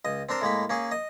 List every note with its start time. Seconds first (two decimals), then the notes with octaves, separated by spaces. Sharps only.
0.05 C#2 D#5
0.29 C4 D4 A#4 C5
0.42 A2 G#3 A#3 B5
0.70 A#3 C#4 G#4
0.92 D#5